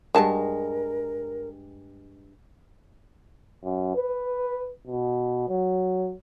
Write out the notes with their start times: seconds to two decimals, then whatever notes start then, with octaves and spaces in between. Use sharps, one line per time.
0.15 G2 F#3 G#3 A#4 A5
3.64 F#2
3.96 B4
4.87 B2
5.49 F#3